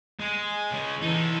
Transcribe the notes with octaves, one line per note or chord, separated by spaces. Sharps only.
G#3
C#3 G#3
E3 D#4 A4